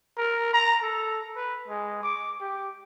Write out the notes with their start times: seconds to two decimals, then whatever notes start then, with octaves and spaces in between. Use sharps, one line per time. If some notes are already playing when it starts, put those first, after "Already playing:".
0.17 A#4
0.53 A#5
0.82 A4
1.36 B4
1.68 G#3
2.03 D6
2.41 G4